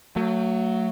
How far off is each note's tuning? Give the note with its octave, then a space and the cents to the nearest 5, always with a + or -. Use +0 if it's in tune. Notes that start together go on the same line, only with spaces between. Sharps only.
F#3 +5 A3 +35